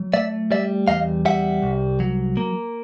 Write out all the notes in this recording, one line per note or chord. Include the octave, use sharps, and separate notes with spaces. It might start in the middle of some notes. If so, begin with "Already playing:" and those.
Already playing: F#3
A3 D5 E5
G3 D5 E5
E2 D#5 F5
G3 E5 F#5
C2
F#3
A#3